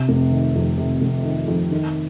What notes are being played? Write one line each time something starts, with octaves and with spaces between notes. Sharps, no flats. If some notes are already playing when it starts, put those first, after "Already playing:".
Already playing: C3
F1
D#3
F2
C3
F1
D#3
F2
D#3